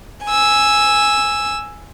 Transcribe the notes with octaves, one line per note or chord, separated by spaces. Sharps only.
G#5 E6